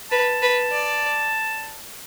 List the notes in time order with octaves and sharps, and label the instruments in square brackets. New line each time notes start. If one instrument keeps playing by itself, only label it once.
[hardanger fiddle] B4 [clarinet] A5
[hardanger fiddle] B4
D5